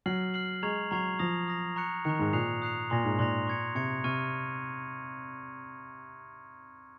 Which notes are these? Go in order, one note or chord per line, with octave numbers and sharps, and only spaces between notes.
F#3 F6 C7 F#7
F6 C7 F#7
G#3 A#5 C#6 G#6 C7 F7
F#3 A#5 C#6 G#6 C7 F7
F3 D#6 A#6 F7
D#6 A#6 F7
A#5 C#6 F#6 C#7
D#3 A#5 C#6 F#6 C#7
G#2
A#2 D#6 F#6 C7 F7
D#6 F#6 C7 F7
A#2 C6 F#6 A#6 F7
G#2
A#2 C6 F#6 A#6 F7
C#6 G#6 C#7
C3 C#6 G#6 C#7
C3 C#6 F6 G#6 D#7